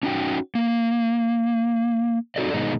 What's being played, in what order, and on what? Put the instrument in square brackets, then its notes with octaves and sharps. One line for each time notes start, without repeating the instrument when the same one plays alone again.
[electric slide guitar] C#4 D#4 F#4 G5
A#3
C4 D#4 F#4 A4 D5 D#5
B2 D#3 G#3 D#4